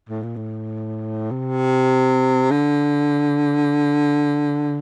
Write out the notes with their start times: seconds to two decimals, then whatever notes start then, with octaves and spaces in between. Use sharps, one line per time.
0.09 A2
0.23 A#2
0.36 A2
1.31 C3
2.51 D3